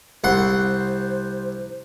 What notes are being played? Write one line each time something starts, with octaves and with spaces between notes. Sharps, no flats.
C2 C5 F#5 C6